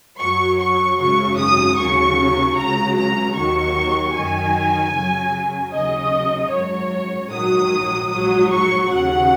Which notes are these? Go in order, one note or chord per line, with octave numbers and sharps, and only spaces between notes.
F#2 F#3 C#6
C#6
G#1 F#2 C#3 F#3 C#6
D#6
D#2 C#3 F#3 C#6
C#2 C#3 F#3 A#5
A#5
D#2 D#3 F#3 C#6
F#2 D#3 F#3 G#5
F#2 C#3 F#3
D#2 C#3 F#3 D#5
G#1 F#2 F#3 C#5
A#1 G#2 D#3 F#3 D#6
A#1 G#2 F#3 D#6
C#6
D#2 C#3 F#3 F#5